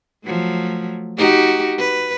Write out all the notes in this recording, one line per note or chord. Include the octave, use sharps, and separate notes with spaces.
F3 F#3 A3
D#4 F#4 G4
B4